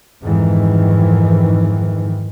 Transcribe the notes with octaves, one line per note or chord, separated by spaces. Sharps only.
F2 G#2 D#3 E3